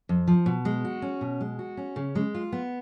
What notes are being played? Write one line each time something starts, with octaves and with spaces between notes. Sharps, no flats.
F2
F3
B2
G#3
F#4
C#4
B2
G#3
F#4
C#4
C#3
G#3
F4
B3